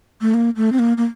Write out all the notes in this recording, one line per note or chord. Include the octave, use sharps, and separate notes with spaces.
A3
A#3
A3
C4
A#3
A#3